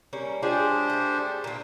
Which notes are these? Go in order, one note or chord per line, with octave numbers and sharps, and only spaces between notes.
G3 A#3 C#4
G#3 D4 F4 G4 G#4 C5
A3 G#4
A#2 A#3